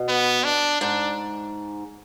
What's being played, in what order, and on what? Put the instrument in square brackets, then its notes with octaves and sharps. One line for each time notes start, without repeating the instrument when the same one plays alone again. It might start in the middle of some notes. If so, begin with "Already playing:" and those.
Already playing: [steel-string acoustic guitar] B2
[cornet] B3
D4
[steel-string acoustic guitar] G#2 [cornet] D4